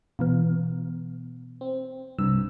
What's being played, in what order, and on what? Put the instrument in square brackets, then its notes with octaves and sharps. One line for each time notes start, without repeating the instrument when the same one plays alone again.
[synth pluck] B2 E3 B3
[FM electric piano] C4
[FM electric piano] C2 G2 C3 [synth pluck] E6